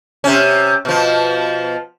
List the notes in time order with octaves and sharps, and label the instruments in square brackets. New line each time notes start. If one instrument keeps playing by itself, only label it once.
[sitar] C3 C#4
B2 F3